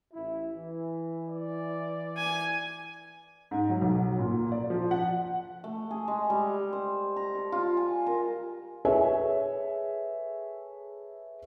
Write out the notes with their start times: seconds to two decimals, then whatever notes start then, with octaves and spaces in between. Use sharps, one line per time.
0.13 A1 E4
0.51 E3
1.29 D5
2.17 G#5
3.51 G#2
3.70 F#3
3.81 B1
4.19 A#2
4.52 D5
4.70 F3
4.91 F#5
5.64 A3
5.91 G#4
6.08 G#3
6.30 G3
6.73 C5
7.16 A#5
7.35 A4
7.52 F4
7.77 G#5
8.06 A#4
8.85 G#4 A4 B4 C#5 E5 G#5